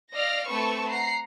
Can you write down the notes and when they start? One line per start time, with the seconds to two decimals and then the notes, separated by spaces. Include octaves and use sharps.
0.14 D5 D#5 F5 F6 A#6
0.47 A3 C4 B4 A5 C#6 E6
0.89 F#5 A#5 C7